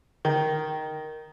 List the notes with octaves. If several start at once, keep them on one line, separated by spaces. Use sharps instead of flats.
D#3